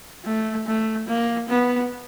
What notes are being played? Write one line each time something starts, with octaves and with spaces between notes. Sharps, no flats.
A3
A3
A#3
B3